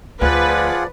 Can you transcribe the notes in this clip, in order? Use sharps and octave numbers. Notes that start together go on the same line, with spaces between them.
D2 F3 F4 G#4 B4 D5 F#5